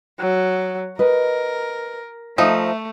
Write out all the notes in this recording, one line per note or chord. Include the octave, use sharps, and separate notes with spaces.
F#3
A#4 B4 D#5
F3 A3 D#4 E5